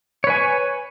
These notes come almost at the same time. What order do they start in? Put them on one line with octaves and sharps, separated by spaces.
C#5 B4 G#5